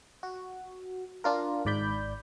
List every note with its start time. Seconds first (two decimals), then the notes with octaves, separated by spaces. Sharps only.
0.23 F#4
1.24 D4 F4 A#4
1.65 G#1 G#2 D5 B5 G6